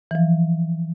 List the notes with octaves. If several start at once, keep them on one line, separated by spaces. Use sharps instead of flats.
E3 F3